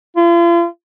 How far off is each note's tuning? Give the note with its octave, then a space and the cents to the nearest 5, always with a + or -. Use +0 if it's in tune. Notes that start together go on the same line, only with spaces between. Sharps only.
F4 -40